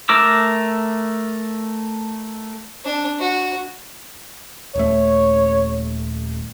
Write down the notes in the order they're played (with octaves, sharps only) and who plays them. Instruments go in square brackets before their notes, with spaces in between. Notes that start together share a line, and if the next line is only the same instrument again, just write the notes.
[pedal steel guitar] A3 A#4 D6 E6
[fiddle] D4
F#4
[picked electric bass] D#1 A3 [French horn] C#5